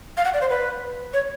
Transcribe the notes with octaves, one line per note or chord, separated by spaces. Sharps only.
F5
F#5
D5
C5
B4
C#5